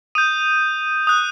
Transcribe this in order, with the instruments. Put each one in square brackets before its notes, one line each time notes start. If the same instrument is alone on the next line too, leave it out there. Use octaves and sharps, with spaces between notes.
[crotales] D#6 G6 D#7
D#6 F#6